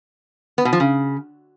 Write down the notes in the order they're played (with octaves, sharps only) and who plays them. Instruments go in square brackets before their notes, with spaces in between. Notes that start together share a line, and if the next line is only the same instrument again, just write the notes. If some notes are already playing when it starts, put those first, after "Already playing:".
[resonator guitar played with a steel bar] B3
B2
F3
C#3